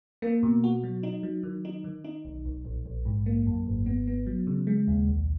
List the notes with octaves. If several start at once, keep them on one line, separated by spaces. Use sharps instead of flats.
A#3
B2
F#4
F#3
D#4
F#3
D#3
D#4
D#3
D#4
B1
B1
A#1
A#1
G#2
A#3
F#2
G#1
B3
B3
F#3
C#3
G#3
D#2
B1